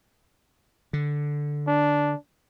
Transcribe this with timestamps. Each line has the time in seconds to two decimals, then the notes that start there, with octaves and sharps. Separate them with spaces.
0.93 D3
1.67 D4